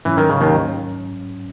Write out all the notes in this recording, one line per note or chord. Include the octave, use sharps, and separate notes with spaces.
G#2 E3 F#3 C#4
D#3
C#3
D#2 D#3